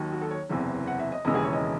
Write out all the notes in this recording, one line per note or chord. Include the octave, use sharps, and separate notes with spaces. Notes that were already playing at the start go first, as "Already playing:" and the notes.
Already playing: D#2 D#3 F#3
F#4
A4
C#5
F#1 E2 C3 E3
F#5
E5
D#5
E1 D#2 C#3 E3 D#5
G#4
C#5
D#5